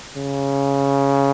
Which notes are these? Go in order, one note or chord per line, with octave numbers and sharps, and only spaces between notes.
C#3